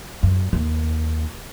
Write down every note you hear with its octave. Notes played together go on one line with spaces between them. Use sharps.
F#2
D#2